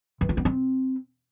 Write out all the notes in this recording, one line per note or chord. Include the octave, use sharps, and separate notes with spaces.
E3
F4
B3
C4